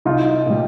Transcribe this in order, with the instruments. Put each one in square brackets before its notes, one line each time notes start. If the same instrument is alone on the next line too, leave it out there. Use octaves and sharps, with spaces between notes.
[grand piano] C2 [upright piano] D#4 F4
[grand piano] A#2 G3